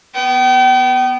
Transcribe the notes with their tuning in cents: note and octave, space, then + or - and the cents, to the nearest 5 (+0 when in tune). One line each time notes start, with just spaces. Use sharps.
B3 +0 G5 -40